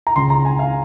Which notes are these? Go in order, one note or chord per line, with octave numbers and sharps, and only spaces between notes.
A#5
C#2 C#3 C6
A#5
G#5
F5